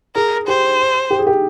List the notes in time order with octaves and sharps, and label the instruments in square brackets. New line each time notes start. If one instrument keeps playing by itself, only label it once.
[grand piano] G#4 [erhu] A#4
[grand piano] G4 [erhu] C5
[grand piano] G4
G#4
G4